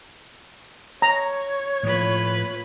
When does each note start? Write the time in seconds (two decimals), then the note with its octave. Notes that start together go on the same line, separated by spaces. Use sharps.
1.02 C#5 A#5
1.83 A2 F3 A3 A#3 F4 B4